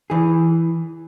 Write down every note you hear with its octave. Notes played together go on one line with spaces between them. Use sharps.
E3 G#4